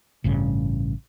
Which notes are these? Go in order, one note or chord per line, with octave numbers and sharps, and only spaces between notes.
A1 G2 C#3